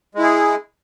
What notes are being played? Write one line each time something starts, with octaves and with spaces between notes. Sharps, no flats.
G#3 E4 G#4